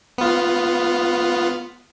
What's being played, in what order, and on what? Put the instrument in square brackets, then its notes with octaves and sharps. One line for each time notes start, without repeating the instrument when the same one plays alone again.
[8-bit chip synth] B3 F4